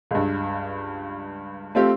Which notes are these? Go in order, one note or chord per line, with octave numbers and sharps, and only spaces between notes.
C#2 G2
A3 C4 F4 G4